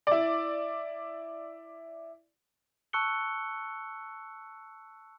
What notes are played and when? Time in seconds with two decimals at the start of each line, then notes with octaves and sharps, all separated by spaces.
0.07 E4 D5
2.93 A5 C#6 E6 F#6 C#7 G7